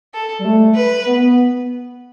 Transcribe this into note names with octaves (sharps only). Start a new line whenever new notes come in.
A4
G3
A3
B4
B3
B3